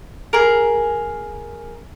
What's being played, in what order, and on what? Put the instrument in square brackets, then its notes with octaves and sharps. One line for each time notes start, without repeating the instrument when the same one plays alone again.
[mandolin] G#4 A#4